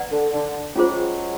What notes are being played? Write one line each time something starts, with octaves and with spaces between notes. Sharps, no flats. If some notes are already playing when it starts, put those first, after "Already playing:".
Already playing: B4 D5 F#5 A#5
D3
D3
F#3 G#3 C#4 F4 G#4 C5